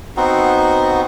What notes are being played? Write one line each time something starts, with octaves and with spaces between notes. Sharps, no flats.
B3 C4 D#4 F#4